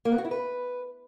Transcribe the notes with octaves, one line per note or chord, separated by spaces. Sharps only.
A#3
B3
F#4
E4
B4